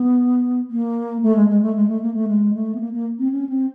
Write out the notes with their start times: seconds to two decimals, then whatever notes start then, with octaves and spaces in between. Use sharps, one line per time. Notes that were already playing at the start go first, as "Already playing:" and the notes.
Already playing: B3
0.70 A#3
1.23 A3
1.36 G#3
1.49 G#3
1.62 A3
1.75 G#3
1.88 A3
2.02 A#3
2.14 A3
2.28 G#3
2.54 A3
2.75 B3
2.80 A#3
2.93 A#3
3.19 C4
3.32 C#4
3.49 C4